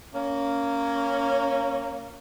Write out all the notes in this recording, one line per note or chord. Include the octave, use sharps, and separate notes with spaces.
A#3 C#4